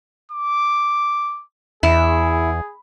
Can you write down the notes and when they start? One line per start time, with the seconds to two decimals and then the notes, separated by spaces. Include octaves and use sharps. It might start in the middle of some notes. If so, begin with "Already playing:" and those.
0.32 D6
1.83 E2 E4 G#4